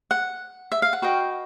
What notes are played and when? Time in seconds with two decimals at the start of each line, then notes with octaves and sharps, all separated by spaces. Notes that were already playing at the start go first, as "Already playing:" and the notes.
0.11 F#5
0.72 E5
0.82 F5
0.93 F#5
1.02 F#4 B4 D#5 G5